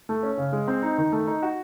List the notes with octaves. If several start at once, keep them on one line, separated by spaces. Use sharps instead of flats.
A3
C#4
C#3
G#3
C4
D#4
D#3
A3
D#4
F#4